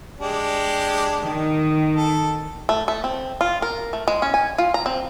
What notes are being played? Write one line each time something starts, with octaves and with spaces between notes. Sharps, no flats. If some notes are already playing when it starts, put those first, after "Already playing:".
G#3 D4 G4
D#3
A4
A3
A3
C4
F4
A#4
A3
G#3
C#4
G#5
F4
A#5
C4